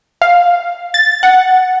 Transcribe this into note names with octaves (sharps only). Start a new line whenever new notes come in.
F5
A6
F#5